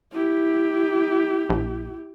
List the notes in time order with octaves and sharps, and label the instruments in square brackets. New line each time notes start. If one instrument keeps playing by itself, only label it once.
[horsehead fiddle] E4 G4
[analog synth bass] A#1